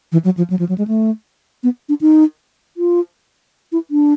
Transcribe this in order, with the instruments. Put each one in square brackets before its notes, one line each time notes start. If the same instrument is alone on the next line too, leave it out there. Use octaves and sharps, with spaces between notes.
[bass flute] E3
F#3
F3
F#3
F3
F#3
G#3
A3
B3
D4
D#4
F4
E4
D4